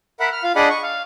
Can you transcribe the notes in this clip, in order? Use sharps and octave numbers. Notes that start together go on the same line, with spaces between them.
A#4 E5 F#5 B5
F6
F4 F5
D4 G#4 D5 D#5 F#5 B5
C#6
F5